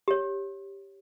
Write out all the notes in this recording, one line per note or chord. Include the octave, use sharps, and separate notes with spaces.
G4 C#5